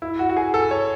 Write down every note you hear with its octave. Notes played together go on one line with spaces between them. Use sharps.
E4
F#4
F#4
G#4
A4
C#5